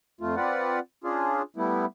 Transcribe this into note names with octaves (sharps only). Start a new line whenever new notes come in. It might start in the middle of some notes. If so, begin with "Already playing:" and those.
F2 A3 F4
C4 F4 B4 D5 F#5
C#4 D4 F4 G#4
G3 A3 B3 E4